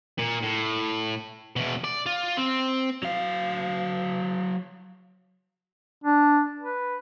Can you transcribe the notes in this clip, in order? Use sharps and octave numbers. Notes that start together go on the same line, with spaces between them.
A#2
A2
E2 B2
D5
F4
C4
F#3 F5
D4
B4